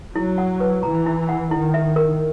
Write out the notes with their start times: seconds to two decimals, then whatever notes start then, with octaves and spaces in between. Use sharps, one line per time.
0.15 F#3 E4
0.38 F#5
0.60 B4
0.83 E3 A#5
1.06 E4
1.29 F#5
1.51 D#3 E4
1.74 E5
1.96 A#4